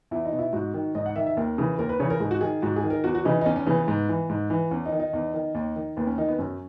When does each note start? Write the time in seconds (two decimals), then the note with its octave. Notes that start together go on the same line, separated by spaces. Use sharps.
0.11 E2 E4
0.25 D#4
0.32 B2
0.39 E4
0.53 G#2 F#4
0.74 D#3
0.95 G#2 D#5
1.06 F#5
1.16 D#3 E5
1.27 E5
1.37 D#2 A#4
1.58 C#3 E3
1.79 D#2 A#4
1.89 B4
2.00 C#3 E3 C#5
2.10 A#4
2.20 G#2 G#4
2.31 F#4
2.41 D#3 G#4
2.62 G#2 F#4
2.76 G#4
2.83 D#3
2.90 A#4
3.04 E2 F#4
3.15 F#4
3.25 C#3 E3 D#4
3.41 D#4
3.46 E2 C#4
3.56 C#4
3.67 C#3 E3 B3
3.77 B3
3.88 G#2
4.09 E3
4.29 G#2
4.50 E3
4.71 E2 C#4
4.86 D#4
4.92 D#3
5.00 D#4
5.13 E2
5.34 D#3
5.55 D#2
5.76 D#3
5.97 D#2 B3
6.07 C#4
6.18 D#3 D#4
6.28 B3
6.39 F#2 C#4